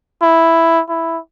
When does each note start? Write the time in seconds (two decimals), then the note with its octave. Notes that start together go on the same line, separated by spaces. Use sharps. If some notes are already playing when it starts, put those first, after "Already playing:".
0.22 E4
0.89 E4